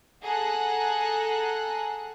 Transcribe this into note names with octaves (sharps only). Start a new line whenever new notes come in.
G#4 A4 F#5 A#5 F#6